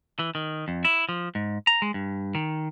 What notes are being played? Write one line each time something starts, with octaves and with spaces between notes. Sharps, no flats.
E3
D#3
F2
E4
F3
G#2
A#5
G#3
G2
D#3